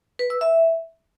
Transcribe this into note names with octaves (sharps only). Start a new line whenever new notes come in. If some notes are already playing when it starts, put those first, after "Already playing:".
B4
E6
E5